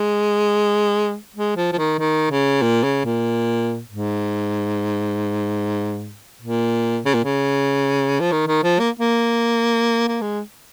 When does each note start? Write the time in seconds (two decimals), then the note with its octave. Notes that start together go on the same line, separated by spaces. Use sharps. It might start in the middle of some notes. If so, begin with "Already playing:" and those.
Already playing: G#3
1.36 G#3
1.57 F3
1.72 F3
1.78 D#3
1.99 D#3
2.31 C#3
2.62 A#2
2.83 C#3
3.05 A#2
3.89 G#2
6.42 A#2
7.05 C#3
7.14 A#2
7.24 C#3
8.20 F3
8.32 D#3
8.47 D#3
8.63 F3
8.79 A#3
8.99 A#3
10.08 A#3
10.21 G#3